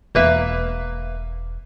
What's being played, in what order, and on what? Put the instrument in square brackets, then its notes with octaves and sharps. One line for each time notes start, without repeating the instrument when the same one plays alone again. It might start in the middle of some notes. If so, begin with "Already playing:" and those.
[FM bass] E1 [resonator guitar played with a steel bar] A#3 B4 E5